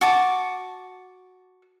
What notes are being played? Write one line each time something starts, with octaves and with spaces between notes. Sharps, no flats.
F#4 A5 D6